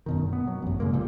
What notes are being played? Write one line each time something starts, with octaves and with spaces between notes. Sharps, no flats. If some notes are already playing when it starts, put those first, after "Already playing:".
F#2 B2 D#3
B3
F#3
A1 F#2
C#3 G#3 A#3
C2 A#2 G3